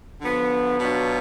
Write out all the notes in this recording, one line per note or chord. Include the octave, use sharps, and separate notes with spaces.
D3 F3 B3
B2 F#3 B3 D4 F4